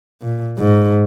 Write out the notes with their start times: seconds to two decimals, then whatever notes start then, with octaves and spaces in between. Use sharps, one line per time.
0.22 A#2
0.58 G#2